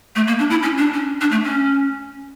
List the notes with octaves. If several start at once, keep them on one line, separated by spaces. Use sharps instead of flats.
A3
A#3
D4
E4
C#4
D4
C#4
D4
A3
C#4